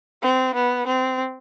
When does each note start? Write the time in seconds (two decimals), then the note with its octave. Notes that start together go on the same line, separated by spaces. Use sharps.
0.22 C4
0.55 B3
0.86 C4